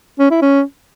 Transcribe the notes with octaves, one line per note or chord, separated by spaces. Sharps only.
C#4
E4
C#4